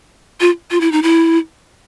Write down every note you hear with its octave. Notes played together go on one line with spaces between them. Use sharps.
F4
F4
E4
D#4
E4